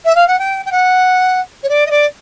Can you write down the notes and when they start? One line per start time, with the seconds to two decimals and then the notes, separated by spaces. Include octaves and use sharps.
0.05 E5
0.15 F5
0.28 F#5
0.39 G5
0.66 G5
0.72 F#5
1.63 C#5
1.69 D5
1.86 D#5
1.90 D5